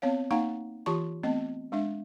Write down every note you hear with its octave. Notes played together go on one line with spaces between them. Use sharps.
B3 C4 C#5 F5
A#3 D#4 F5 F#5 A#5
E3 F4 G4 A5 C6 C#6
A3 B3 C4 D#5
G#3 D4 E5